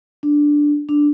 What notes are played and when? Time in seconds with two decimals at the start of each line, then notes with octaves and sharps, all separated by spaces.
0.23 D4
0.89 D4